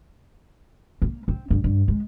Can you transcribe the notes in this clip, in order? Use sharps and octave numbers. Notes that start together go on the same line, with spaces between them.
A#3
C4
G2
G2
G#3